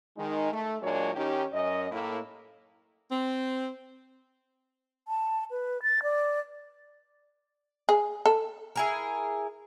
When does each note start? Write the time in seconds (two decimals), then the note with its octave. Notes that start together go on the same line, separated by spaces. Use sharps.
0.18 D#3 G#3 D#4
0.52 A3
0.82 A#2 F#3 G#3 A#3 D4 C#5
1.15 D#3 C#4 D#4 G4
1.53 F#2 D#5
1.92 A2 A#3 E4
3.12 C4
5.08 A5
5.51 B4
5.83 A6
6.03 D5
7.89 G#4
8.26 A4
8.76 E4 G#4 A#4